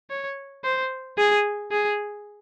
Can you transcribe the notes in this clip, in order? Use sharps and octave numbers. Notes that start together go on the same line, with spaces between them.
C#5
C5
G#4
G#4